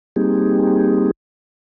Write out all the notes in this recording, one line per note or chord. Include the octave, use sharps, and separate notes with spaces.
G3 A#3 C4 D#4 G4 G#4